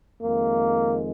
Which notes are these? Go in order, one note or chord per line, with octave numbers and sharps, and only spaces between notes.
F2 D#3 G#3 A#3